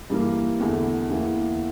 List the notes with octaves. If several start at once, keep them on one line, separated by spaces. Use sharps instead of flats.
G2 E3 A#3
E2 D3 A3 E4
E2 E3 A#3 E4